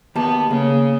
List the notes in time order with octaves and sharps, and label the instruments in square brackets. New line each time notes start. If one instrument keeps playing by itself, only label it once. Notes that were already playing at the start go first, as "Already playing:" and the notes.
[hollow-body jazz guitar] D#2 G4 A5 [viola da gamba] B3
[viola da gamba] C#3 [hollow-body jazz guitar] A#3